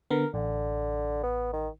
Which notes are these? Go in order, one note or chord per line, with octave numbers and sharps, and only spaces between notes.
D3 B3 A#4
A1 D3
B3
D#3